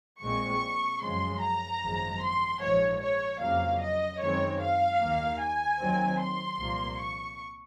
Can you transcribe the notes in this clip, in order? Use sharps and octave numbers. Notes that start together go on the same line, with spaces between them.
A#1 A#2 G#3 C4 C#6
F#2 C#3 F3 G#3 C6
A#5
G#1 F#2 F3 G#3
C6
A#1 G#2 F3 G#3 C#5
C#5
F2 C#3 F#3 A#3 F5
D#5
F#2 D#3 G#3 C4 C#5
F5
D#2 D#3 A#3
G#5
D#2 D#3 F#3 C4
C6
C2 A#2 F3 A#3
C#6